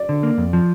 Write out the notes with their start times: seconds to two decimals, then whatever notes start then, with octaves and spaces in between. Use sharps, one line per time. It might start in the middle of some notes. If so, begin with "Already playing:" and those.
Already playing: D5
0.09 D3
0.23 A#3
0.38 F2
0.53 F3